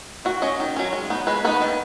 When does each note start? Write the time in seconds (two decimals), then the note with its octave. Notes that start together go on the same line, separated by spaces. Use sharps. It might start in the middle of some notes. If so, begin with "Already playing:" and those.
0.25 D#3 F#4
0.42 F#3 C#4 D#5
0.60 D#3
0.76 F#3 C#4
0.93 G#3
1.10 B3 D#4
1.27 G#3 B4
1.45 B3 D#4 B4
1.62 D#3